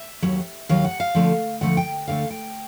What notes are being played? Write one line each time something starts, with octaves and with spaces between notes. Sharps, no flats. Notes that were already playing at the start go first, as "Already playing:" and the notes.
Already playing: E5
D#2 D#3 F#3
D#2 D#3 F#3 F5
F#5
F5
D2 D3 F3 A3
D2 D3 F3 A3 F#5
G5
D2 D3 F3 A3 F5
G5